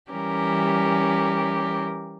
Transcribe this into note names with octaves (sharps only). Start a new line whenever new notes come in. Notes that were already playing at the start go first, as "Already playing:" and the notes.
E3 G3 C#4 G4 A#4